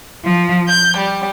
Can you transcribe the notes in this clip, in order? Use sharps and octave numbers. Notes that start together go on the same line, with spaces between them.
F3
G6
G3